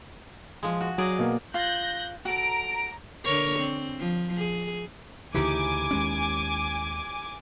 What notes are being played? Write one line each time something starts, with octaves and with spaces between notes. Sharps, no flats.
F3 G#3
F#4
F#3 G#4 D5 D#5
B2 A#3
F4 F#6 G6 A#6
F#4 A4 A#5 D7
D3 A#4 C#5
C4
F3
G#4
D2 C#3 E3 D#4 E4 G4 G#5 D6
D#2 G#3 C#4